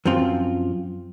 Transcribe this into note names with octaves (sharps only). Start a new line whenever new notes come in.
F#2 F3 C4 F4